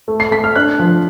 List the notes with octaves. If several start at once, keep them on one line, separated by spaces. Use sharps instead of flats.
A3
C7
A3 B6
F6
D4 F#6
F3